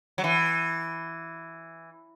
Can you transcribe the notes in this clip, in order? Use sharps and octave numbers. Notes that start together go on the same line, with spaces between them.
F#3
E3